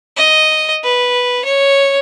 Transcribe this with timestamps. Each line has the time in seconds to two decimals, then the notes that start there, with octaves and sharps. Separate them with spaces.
0.17 D#5
0.83 B4
1.44 C#5